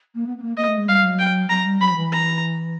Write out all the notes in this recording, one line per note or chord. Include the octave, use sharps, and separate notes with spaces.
A#3
B3
B3
A#3
A#3 D#5
A3
G#3
G3 F5
F#3
G5
F#3 A#5
G3
F#3 B5
F3
E3
A#5